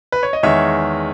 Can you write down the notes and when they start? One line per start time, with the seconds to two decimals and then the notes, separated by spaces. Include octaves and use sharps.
0.12 B4
0.23 C#5
0.33 D#5
0.43 E2 D#3 G#3 C#5 E5